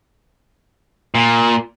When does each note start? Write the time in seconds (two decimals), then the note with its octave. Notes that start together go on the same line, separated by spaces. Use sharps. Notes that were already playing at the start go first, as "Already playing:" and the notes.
1.15 A#2